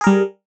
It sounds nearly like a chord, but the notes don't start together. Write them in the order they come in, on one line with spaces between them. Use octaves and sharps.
G#4 A#4 G3